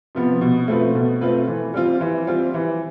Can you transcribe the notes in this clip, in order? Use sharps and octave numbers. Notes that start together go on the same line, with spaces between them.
C3 F3 B3
B2
A3 C4 F4 B4
B2
A3 C4 F4 B4
E3
G3 C4 F4
E3
G3 C4 F4
E3